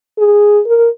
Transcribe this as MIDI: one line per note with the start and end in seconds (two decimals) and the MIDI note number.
0.19 0.60 68
0.66 0.88 70